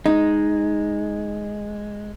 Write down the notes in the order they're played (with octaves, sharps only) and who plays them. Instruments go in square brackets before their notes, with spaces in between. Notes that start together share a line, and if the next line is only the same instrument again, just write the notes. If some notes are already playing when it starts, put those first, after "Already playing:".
[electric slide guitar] G#3 [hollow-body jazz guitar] D#4